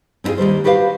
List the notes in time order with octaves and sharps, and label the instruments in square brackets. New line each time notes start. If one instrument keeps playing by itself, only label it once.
[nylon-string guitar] C4 C#4 E4 F4 G#4
D#2 D#3 G3 C5
F#4 G4 B4 C5 D#5 F5